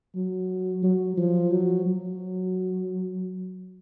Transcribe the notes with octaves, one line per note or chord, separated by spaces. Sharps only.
F#3
F#3
F3
F#3
F#3